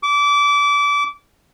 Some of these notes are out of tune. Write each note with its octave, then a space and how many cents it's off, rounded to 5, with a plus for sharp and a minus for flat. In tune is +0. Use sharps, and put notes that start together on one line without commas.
D6 -25